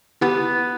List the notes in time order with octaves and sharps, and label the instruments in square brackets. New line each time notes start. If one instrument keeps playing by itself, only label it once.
[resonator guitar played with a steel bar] B3 [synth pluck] E4 G4